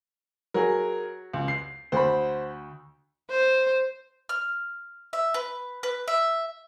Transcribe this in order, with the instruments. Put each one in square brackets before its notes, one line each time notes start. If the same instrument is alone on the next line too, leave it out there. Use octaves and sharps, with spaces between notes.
[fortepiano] F#3 [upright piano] G#4 A#4
[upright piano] C#2
C7
[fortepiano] D2 B5 [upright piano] C5
[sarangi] C5
[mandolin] F6
E5
B4
B4
E5